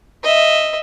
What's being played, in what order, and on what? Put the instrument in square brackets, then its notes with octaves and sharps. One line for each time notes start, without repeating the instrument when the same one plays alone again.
[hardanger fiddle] D#5 E5